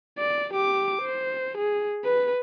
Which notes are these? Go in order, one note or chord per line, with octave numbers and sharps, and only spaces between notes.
D5
G4 D6
C5
G#4
B4